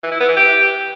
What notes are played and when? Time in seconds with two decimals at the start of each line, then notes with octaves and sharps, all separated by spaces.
0.03 E3
0.12 E4
0.20 B3
0.28 E3
0.37 G4